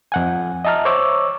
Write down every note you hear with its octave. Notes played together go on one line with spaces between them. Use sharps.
F2 F#5 G#5
D#5 E5 A5 A#5 F6
C5 C#5 C#6 D6 E6